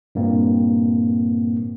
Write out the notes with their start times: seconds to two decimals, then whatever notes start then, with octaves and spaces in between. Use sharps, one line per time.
0.15 G2 A#2 A#3 C4